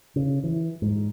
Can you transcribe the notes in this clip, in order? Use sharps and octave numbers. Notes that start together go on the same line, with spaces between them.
C#3
E3
G#2